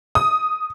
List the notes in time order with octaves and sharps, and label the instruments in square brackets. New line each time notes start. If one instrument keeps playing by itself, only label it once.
[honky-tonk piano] D#6